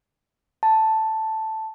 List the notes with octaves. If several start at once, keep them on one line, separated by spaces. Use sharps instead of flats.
A5